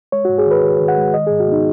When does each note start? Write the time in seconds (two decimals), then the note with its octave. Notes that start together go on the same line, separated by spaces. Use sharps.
0.12 G#3 C#5
0.25 G#2 F#4
0.38 G#4
0.46 D#3 B4
0.64 D#3
0.80 D#3
0.88 F#5
0.97 G#3
1.14 D#3 D#5
1.27 G#2 G#4
1.40 F#4
1.48 B3 D#4